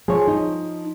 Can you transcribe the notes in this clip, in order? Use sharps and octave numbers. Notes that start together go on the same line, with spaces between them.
F3 G#4 C#5
D#4